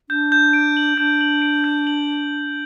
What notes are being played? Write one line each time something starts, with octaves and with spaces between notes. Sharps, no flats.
D4 G6
G6
D7
F#7
D4 G6
F#7
D7
G6
F#7